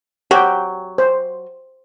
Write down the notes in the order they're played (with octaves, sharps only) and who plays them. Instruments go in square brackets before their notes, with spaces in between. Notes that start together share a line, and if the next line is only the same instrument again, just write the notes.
[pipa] F#3 [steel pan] G4 G5
[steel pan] C5